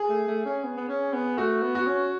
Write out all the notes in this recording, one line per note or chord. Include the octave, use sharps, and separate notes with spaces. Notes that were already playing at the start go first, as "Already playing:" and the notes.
Already playing: G#4
A3
A3
C#4
B3
B3
C#4
B3
A3 F#4
B3
F#4
C#4